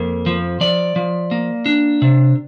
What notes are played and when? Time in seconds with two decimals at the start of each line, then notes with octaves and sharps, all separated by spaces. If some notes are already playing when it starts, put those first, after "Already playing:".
Already playing: F2 A#3
0.26 F3
0.61 F3 D5
0.96 F3
1.31 A#3
1.66 D4
2.02 C3